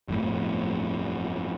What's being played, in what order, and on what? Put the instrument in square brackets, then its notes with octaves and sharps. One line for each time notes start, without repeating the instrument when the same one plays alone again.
[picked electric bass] G1 F2 A2